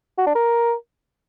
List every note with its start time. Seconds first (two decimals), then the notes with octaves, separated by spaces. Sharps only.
0.18 F#4
0.27 D4
0.35 A#4